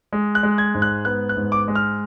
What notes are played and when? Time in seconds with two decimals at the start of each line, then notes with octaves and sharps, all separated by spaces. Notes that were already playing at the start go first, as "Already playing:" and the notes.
0.12 G#3
0.35 F#6
0.43 G#3
0.58 G#6
0.74 G#2
0.82 F#6
1.05 B3 F#6
1.29 F#6
1.37 G#2
1.52 D6
1.68 G#3
1.75 F6